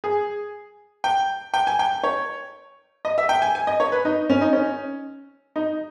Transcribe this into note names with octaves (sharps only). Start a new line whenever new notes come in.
G#4
G5
G5
G#5
G5
C#5
D#5
E5
G5
G#5
G#5
D#5
C#5
B4
D#4
C#4
D#4
C#4
D#4